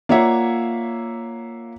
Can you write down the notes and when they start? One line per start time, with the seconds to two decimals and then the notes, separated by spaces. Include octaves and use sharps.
0.09 A#3 F4 C#5 D5 E5 F#5